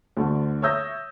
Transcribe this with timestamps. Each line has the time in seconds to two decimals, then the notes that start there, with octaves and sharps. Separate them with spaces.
0.17 D2 D3 A3
0.62 C#5 E5 D#6 E6 G6 A#6